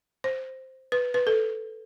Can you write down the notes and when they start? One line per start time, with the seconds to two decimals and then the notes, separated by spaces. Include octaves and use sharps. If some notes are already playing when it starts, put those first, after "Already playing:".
0.24 C5
0.92 B4
1.14 B4
1.27 A4